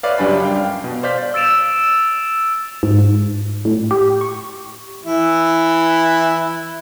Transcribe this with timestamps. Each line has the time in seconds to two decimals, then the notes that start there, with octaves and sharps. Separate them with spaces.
0.03 B4 C#5 D5 E5 F5
0.18 C#2 F#2 G3 D4 G#5 B5
0.42 F5 G5
0.55 F5
0.84 B2
1.03 C5 D5 F5 G6 B6
1.34 E6 A6 D7 E7 F7
2.83 G#2
3.65 A2
3.91 G4
4.21 C#6
5.05 E3 E4